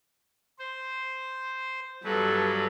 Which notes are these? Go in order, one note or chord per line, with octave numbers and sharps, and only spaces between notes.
C5
G2 F#3 G3 A4 B4